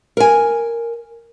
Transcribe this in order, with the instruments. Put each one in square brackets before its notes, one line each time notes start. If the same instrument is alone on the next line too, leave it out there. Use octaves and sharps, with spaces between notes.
[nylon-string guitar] A#4 G#5